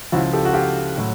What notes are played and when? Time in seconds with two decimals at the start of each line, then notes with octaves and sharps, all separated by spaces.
0.12 C#2 C#3 F3 E4 F#4
0.33 G4 A4
0.45 F#4
0.53 F4 G4
0.97 A2 F#3